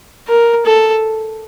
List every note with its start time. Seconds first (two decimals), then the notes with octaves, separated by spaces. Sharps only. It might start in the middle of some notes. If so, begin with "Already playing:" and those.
0.28 A#4
0.66 A4